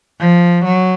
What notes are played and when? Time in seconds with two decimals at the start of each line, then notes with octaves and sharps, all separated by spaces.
0.20 F3
0.64 F#3